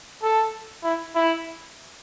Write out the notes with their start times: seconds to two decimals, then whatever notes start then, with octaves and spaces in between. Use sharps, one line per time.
0.23 A4
0.84 E4
1.15 E4